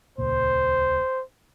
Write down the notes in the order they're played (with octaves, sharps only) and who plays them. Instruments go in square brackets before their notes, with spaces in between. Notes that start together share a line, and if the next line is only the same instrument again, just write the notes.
[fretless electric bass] D#1 C#2 A#2 [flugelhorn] C5